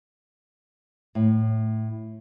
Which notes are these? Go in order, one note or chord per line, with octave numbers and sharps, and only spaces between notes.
A2